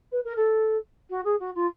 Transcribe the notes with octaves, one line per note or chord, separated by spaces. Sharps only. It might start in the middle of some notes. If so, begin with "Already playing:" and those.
B4
A#4
A4
F#4
G#4
F#4
F4